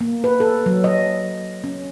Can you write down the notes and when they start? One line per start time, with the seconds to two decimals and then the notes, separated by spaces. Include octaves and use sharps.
0.01 A#3
0.24 B4
0.40 A4
0.66 F#3
0.84 D#5
1.64 C#4